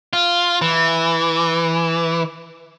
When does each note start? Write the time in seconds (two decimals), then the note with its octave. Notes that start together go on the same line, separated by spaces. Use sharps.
0.13 F4
0.62 E3